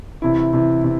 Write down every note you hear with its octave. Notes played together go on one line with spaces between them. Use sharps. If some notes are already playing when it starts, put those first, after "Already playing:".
C3 E3 E4
C3 E3
C3